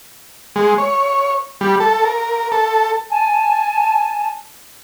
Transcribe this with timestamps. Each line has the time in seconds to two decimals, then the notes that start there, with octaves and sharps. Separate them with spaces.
0.56 G#3
0.78 C#5
1.61 G3
1.80 A4
2.05 A#4
2.52 A4
3.10 G#5 A5